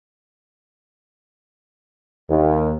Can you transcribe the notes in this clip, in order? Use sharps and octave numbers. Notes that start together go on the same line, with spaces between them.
D#2